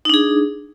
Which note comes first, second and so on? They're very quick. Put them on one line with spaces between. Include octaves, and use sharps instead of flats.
D#4 D4 G#4